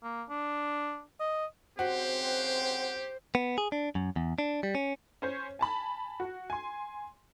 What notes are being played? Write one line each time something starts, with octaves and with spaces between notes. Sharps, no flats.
A#3
D4
D#5
G#1 C#3 C4 F#4 G4 C5
B3
G#4
D4
F#2
E2
D4
G3
C#4
C#4 C5 C#5
G#5 A5 B5
F#4
G#5 C6